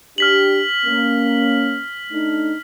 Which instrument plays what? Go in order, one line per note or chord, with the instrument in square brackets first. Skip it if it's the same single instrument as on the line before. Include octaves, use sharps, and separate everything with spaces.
[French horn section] D4 G4 [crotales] F6 B6 F#7
[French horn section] A#3 C#4
A3 D4 D#4